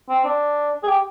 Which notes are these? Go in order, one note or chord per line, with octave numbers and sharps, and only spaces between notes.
C4
D4
G#4
G4